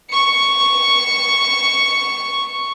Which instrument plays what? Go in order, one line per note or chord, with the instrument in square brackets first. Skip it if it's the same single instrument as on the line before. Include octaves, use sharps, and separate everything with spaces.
[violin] C#6 C#7